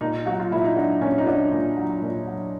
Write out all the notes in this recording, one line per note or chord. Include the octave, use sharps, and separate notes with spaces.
A#2 D#4
F#3 F#4
F4
A#2 E4
D#4
F#3 D4
A#2 C#4
D#4
F#3 D4
A#2
F#3
A#2
F#3